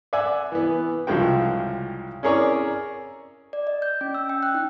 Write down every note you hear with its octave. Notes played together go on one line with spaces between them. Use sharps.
D5 E5 F#5 G#5
E3 B3
C2 C#3 F3 G#3 F#4 G5
C#4 E4 G#4 A#4 C#5 D5
D5
D#5
G6
C#4
E6
G5
F#6
D#4